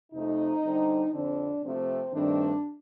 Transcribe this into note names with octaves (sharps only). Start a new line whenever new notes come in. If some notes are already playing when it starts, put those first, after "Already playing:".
F2 C3 F3 A3 D#4
D3 G3 C4
F2 D3 F3 C4 D4
C3 F3 A3 C4
G2 D#3 A3 C4 D4